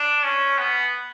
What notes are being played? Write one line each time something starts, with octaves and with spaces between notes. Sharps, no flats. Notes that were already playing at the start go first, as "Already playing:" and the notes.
Already playing: D4
C#4
B3